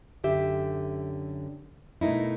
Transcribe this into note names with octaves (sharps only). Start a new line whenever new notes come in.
F#2 D3 G4 E5
B2 A3 A#3 D#4 E4